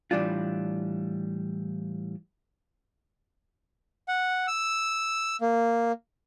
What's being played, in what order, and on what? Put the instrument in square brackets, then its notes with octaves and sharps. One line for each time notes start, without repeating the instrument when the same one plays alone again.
[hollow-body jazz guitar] A2 E3 G3 D4 F4
[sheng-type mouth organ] F#5
E6
A#3